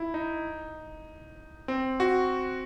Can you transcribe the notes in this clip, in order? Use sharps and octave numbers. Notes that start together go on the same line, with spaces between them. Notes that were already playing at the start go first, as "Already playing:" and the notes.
Already playing: E4
D#4
C4
F#4